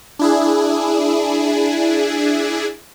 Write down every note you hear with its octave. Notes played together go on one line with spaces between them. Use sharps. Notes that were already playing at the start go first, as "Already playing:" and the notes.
D4 E4 G#4